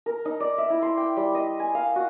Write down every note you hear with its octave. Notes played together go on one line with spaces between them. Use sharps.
A#4
D#4
D5
E5
E4
C6
G5
G3
D#5
G#5
F5
F#4